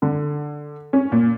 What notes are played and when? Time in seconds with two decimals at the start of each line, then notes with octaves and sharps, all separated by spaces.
0.02 D3
0.93 C#4
1.12 A#2